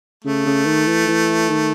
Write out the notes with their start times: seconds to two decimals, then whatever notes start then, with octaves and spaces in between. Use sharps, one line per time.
0.24 C#3 A3
0.46 C#3
0.66 D#3
0.87 E3
1.07 E3
1.50 D#3